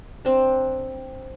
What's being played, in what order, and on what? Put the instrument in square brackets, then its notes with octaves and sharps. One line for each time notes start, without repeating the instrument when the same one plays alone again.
[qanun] C4 D4